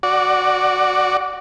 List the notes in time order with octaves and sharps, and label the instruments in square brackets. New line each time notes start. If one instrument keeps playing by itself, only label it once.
[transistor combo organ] F#4 D5